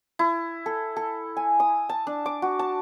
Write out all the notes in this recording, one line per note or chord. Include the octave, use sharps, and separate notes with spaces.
E4
A4
A4
G#5
D#6
A5
D4
D6
F#4
A5